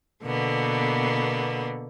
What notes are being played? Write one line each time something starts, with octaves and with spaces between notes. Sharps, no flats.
B2 D3 A#3 B3